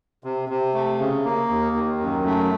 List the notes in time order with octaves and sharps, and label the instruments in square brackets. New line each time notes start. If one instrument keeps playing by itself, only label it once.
[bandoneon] C3
C3
A3
C#3
A#3
D#2
D#3
F#2
A3